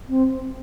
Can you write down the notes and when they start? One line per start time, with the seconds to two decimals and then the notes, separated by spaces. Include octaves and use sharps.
0.08 C4